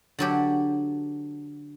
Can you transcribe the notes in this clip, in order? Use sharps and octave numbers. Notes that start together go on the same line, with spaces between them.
D3 F#3 G4